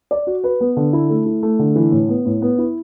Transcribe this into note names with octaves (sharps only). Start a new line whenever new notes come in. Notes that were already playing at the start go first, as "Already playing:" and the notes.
D5
F#4
B4
B3
D3
E4
A3
E4
A3
D3
E3
A2
B3
A2
B3
E4